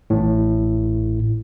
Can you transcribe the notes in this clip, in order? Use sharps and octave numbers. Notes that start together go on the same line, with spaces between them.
A1 A2